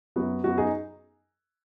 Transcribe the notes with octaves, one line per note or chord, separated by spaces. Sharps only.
F#2 F#3 B3 F#4
F#2 F#3 B3 F#4
D#4 G#4